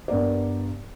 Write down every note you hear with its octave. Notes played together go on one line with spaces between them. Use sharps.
G2 B3 A#4 D5